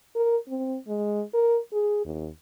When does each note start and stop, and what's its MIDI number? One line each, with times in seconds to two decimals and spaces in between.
0.16 0.36 70
0.48 0.77 60
0.88 1.22 56
1.34 1.59 70
1.73 2.05 68
2.05 2.29 39